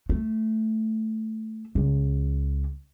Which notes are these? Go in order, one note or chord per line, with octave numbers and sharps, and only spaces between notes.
A3
C#2